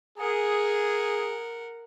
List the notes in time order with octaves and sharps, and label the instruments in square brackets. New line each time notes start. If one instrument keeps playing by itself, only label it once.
[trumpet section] G#4 [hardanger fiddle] A#4 F#5